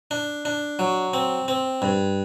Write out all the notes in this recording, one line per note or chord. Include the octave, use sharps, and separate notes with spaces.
D4
D4
F#3
C4
C4
G2